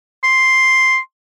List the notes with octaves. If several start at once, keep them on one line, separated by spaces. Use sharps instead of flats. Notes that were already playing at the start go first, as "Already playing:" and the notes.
C6